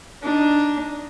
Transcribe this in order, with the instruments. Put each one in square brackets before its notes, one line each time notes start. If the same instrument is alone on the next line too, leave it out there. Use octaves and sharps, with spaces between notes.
[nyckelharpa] D4 D#4